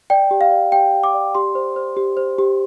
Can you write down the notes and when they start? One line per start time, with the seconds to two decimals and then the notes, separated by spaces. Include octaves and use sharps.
0.10 D5 G5
0.31 G4
0.41 F5
0.51 D5
0.72 G4 G5
0.93 G4
1.04 D6
1.14 D5
1.35 G4 C6
1.55 C5
1.76 C5
1.97 G4
2.17 C5
2.39 G4